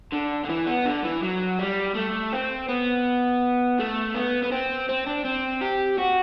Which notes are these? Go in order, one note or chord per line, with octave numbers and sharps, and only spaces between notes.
D3
D3
E3
B3
D3
E3
F#3
G3
A3
C4
B3
A3
B3
B3
C4
C4
D4
C4
G4
F#4